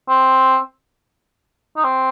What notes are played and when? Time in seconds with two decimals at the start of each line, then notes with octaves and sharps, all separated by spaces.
0.09 C4
1.76 D#4
1.84 C4